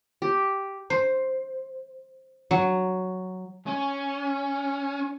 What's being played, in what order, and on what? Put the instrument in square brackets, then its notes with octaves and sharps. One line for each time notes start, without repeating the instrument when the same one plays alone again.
[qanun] G4
[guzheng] C5
F#3
[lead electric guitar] C#4 [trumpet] G#5